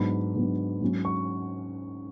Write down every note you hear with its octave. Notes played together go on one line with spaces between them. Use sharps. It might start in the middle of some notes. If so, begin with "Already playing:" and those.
Already playing: G#2 F#3 B3 D4 B5
G#2 F#3 B3 D4
G#2 F#3 C#4
C#6